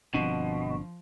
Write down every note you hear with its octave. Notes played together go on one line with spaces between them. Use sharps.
G1 B2 F3 C4 D4